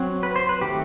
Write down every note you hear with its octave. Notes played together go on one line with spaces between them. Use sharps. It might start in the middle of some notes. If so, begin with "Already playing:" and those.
Already playing: F#3 C4
B4
C5
B4
D#3 A3 C4 G4